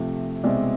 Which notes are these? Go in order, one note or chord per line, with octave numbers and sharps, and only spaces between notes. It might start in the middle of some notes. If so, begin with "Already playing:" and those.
Already playing: C3 F3 A3
C2 B2 G#3 C4 D5 E5